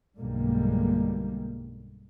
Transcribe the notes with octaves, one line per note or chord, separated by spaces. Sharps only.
B1 G2 D3 G3 G#3 A#3